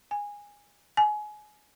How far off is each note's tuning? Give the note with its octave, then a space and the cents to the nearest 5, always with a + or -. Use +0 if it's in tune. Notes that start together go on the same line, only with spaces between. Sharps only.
G#5 -15
G#5 +25